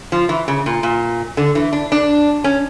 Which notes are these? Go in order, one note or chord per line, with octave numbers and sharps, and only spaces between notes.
F3
E3
C#3
A#2
A#2
D3
E3
D4
D4
C#4